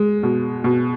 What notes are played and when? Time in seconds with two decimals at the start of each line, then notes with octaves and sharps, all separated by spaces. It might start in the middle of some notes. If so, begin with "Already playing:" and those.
Already playing: G#3
0.23 B2
0.64 B2